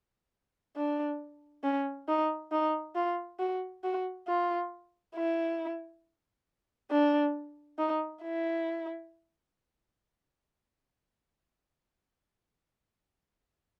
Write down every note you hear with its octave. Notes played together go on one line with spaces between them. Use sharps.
D4
C#4
D#4
D#4
F4
F#4
F#4
F4
E4
D4
D#4
E4